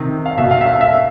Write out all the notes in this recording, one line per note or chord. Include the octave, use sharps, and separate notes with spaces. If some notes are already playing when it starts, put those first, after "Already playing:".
Already playing: C3 D#3
F5
B2 E5
F5
E5
F5
E5